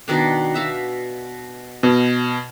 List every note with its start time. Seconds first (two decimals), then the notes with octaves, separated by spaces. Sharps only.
0.08 B2 D#3 D4
0.54 F#4 E5 F5
1.83 B2